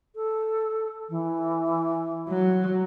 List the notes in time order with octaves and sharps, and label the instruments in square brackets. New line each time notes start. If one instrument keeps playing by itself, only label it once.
[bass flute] A4
E3
[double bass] F#3